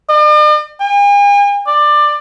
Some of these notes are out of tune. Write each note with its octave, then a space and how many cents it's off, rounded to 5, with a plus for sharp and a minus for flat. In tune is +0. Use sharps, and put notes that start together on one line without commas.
D5 +45
G#5 -45
D5 +15